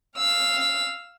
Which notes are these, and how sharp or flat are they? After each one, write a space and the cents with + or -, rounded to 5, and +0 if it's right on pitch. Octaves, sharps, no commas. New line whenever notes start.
F5 +0 E6 +0